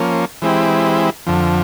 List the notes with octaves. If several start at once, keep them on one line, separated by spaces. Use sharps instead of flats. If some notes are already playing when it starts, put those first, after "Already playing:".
Already playing: F3 A#3 C#4
E3 G#3 C4 E4 G4
F2 D3 F3